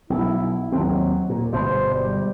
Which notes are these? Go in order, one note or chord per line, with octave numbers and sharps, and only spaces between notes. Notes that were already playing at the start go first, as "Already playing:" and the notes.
B1 E4
D#2 F#3 C4
A#2
G1 B2 G#3 C5
G3